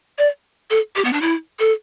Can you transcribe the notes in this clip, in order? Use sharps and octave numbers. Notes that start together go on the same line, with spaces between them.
D5
A4
G4
B3
D4
E4
A4